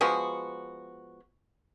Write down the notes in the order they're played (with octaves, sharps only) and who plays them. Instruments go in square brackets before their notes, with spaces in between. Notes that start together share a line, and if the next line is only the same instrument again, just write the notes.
[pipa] F3 G#3 B3 F#4